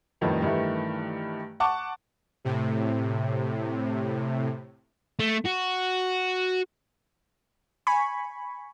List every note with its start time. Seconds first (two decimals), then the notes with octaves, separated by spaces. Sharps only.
0.21 F2 A2 D#3 G3 B3
0.42 G2 D#3 E3 A3
1.60 F#5 A5 C#6 D6
2.45 A2 C3
5.20 A3
5.46 F#4
7.87 G#5 B5 C#6